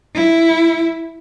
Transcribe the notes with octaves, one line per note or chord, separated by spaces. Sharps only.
E4